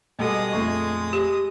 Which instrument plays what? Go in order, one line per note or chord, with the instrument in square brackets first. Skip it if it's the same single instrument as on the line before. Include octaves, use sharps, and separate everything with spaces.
[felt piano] B2 G3 A4 [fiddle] G#3 D#6
[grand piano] A#1 F2 A3 [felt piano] C#6 C7
[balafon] G4